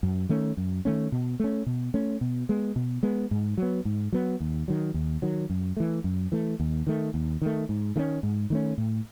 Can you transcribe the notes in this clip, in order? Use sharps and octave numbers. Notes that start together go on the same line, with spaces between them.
F#2
D#3 A3 C#4
F#2
D#3 A3 C#4
B2
A3 C#4
B2
A3 C#4
B2
G#3 B3
B2
G#3 B3
G#2
F#3 B3
G#2
F#3 B3
D#2
D#3 F#3
D#2
D#3 F#3
F#2
E3 A3
F#2
E3 A3
D#2
D#3 A3
D#2
D#3 A3
G#2
D#3 A3 C#4
G#2
D#3 A3 C#4
A2